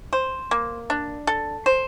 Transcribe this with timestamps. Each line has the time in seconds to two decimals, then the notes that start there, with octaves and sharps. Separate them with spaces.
0.13 C5
0.51 A#3
0.90 D4
1.27 A4
1.66 C5